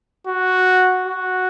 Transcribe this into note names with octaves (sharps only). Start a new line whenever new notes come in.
F#4
F#4